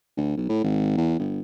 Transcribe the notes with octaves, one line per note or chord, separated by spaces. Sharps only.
D2
B1
A2
G#1
E2
G1